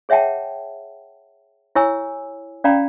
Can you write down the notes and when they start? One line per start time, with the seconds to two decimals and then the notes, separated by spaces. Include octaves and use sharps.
0.09 G#4 C#5 E5 F#5 G5 A5
1.75 E4 G4 C#5 G#5 E6
2.64 C#4 D5 F5 G5 A#5 B5